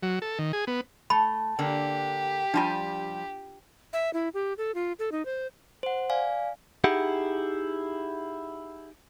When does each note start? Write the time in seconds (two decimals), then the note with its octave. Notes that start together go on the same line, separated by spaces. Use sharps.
0.03 F#3
0.22 A4
0.39 D#3
0.53 G#4
0.67 B3
1.10 A3 B5
1.59 D3 A#3 G4 A#4
2.54 F3 G3 D4 F4 G#5
3.93 E5
4.14 E4
4.34 G4
4.58 A4
4.75 F4
4.99 A4
5.12 D#4
5.25 C5
5.83 C5 F#5
6.10 D5 F5 G#5
6.84 D#4 E4 G4 G#4 F#5